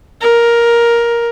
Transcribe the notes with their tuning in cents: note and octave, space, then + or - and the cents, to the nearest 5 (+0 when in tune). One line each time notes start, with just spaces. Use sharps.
A#4 +10